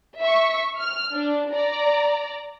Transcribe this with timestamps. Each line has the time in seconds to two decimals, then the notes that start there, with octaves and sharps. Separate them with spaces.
0.21 E5 C#6
0.79 F6
1.14 D4
1.53 D5 A#5